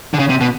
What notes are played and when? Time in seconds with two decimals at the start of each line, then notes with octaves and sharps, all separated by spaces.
0.14 D3
0.19 C#3
0.29 C3
0.41 B2